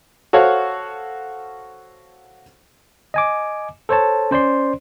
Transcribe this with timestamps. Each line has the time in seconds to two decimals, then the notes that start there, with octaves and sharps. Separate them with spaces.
0.33 F#4 A4 C5 C#5 F5 F#5
3.14 D#5 G#5 D6
3.89 A4 C5 C#5 A5
4.31 C#4 C5 D5 C6